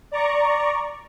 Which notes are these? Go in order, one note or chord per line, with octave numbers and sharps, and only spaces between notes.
D5 A#5 C#6